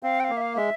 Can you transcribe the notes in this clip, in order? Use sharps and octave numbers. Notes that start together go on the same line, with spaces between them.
C4 F5
G5
F5
A#3
E5
F5
G#3 E5